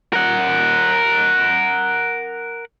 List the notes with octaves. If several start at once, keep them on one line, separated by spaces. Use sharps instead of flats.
A#4 F#5